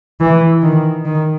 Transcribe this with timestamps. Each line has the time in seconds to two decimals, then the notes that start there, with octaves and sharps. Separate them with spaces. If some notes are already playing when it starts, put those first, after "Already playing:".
0.20 E3
0.62 D#3
1.05 D#3